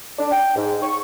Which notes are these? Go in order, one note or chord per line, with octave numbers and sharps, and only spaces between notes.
D4
G5
G#2
C#6